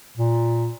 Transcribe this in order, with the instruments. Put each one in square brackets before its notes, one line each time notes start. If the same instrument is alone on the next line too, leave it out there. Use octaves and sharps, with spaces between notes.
[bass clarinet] A#2